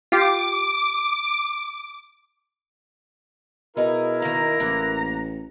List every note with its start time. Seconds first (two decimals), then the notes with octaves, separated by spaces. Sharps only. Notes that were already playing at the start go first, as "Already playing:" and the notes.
0.12 F4 G4 D6 C7
3.77 B2 D#4 E4 G#4 A#4
4.22 D#3 A#3 A#5
4.60 A1 A#3 F#5